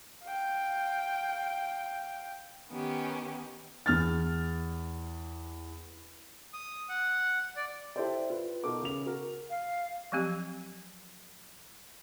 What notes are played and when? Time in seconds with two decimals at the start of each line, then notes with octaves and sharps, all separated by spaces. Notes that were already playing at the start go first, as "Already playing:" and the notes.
0.24 F5 G5
2.69 D#3 B3 C#4 G4
3.86 E2 F6 A6
6.53 D#6
6.89 F#5
7.56 D5
7.96 E4 G4 A4 C5 D5
8.30 F4 B4
8.64 B2 D#4 F#4 A4 A#4 D6
8.82 C#3 F7
9.06 F#4 A#4
9.50 F5
10.12 F3 F#3 A3 C4 G4